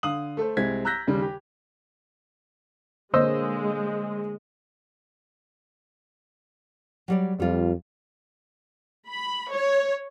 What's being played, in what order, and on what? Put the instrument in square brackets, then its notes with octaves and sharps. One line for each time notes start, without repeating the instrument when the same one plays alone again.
[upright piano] D3 F5 D#6 F#7
A3 A4 C5
C2 G#3 C4 G#6 B6
A#5 E6 F#6 G6 A#6 B6
D#2 C#3 G3
G4
[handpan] D3 A#3 C#5 [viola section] G#3 [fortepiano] C5 D#5 E6
[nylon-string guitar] F#3 G3 D5
[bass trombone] F2 [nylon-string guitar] G3 F4
[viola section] B5
C#5